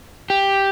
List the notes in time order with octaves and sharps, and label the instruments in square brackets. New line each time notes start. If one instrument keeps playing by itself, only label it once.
[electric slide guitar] G4